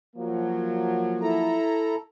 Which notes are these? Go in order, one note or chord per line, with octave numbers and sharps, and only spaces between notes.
F3 F#3 A#3
E4 A4 A#5